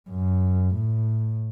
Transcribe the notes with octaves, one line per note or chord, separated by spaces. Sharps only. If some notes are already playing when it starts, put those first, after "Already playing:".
F#2
A2